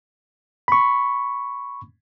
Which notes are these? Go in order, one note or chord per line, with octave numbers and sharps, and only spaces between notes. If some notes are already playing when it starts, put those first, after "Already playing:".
B5 C#6